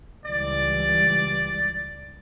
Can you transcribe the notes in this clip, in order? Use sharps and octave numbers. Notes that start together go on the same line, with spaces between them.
C#2 E3 G3 D5